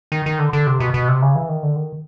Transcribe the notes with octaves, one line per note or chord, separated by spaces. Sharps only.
D#3
D#3
D3
D3
C3
B2
B2
C3
C#3
E3
D#3
D3
D#3